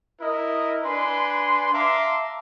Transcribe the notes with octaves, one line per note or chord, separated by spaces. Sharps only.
E4 A#4 D#5
D4 B4 G#5 C6
E5 F5 A5 A#5 C6 D6